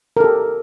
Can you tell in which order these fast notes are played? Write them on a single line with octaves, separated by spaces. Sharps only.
A#4 A4 G4